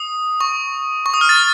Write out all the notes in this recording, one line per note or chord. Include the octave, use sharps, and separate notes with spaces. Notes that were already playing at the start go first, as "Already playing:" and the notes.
Already playing: D#6
C#6
C#6
D#6
F6
A6